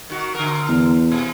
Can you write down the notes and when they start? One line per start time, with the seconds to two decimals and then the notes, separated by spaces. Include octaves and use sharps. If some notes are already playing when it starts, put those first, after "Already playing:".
0.10 D#3 F#4
0.35 D3 A#4
0.68 E2
1.12 B2